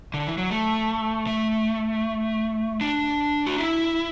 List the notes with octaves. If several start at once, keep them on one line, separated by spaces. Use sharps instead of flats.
D3
E3
F#3
A3
A3
D4
F#4
E4